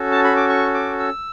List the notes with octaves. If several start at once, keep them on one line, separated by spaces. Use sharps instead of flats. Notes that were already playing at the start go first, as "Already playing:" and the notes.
Already playing: C#4 F#4 A4
A5
B5
D6
C#6
D6
E6